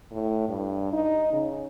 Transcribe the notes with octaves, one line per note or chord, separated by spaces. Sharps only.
A2
G2
D#4
C#3